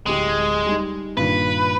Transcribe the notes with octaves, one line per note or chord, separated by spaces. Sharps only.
D1 G#3 G4
G3 D#4
G2 A#2 D#3 B4